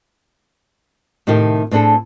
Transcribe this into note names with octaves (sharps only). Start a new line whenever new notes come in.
A2 C3 D#3 A3 G4
A2 C4 D4 G#4 A4